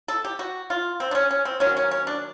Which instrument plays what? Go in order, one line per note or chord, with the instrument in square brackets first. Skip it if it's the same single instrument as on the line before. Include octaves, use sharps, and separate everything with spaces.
[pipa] A4
G4
F#4
F4
C4
D4
C#4
C#4
C4
D#3 F#3 A#3 C#4
C#4
C#4
D4